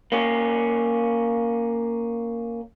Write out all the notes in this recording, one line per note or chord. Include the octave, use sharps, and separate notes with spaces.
A#3 C#4 G4